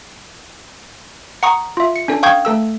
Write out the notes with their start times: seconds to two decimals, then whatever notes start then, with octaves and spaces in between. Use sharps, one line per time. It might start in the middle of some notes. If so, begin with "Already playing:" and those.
1.43 F#5 A#5 C#6 D#6
1.77 F4 E5
1.96 C#7
2.08 C#4 D4 A4
2.23 F5 G5 C#6 D#6 G6 G#6
2.45 A3 A4 E6